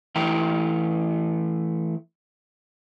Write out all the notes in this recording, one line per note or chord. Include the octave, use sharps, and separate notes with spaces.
E3 A3 E4 G5 A#5